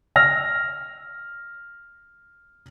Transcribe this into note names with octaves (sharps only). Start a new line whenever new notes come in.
E6 F6 A#6